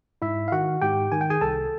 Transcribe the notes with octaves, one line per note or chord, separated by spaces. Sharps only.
G#2 E4 E5
F5
D#3 F#4 F#5
G#2 G4 G5
D#3 G#5
G5
G#4 G#5
C2 A4 A5